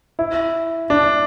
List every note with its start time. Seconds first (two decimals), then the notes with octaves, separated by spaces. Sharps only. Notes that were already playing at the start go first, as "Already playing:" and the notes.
0.19 E4
0.90 D4